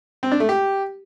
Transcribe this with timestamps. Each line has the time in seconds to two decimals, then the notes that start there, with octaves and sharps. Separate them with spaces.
0.23 C4
0.32 D4
0.40 A3
0.49 G4